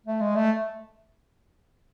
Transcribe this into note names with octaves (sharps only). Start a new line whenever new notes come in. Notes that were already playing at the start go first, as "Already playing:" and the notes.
A3
G#3
A3